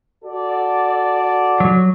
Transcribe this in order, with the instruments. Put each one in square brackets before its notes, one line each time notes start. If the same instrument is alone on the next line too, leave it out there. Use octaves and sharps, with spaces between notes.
[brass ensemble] F#4 A4 D5
[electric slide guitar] F#3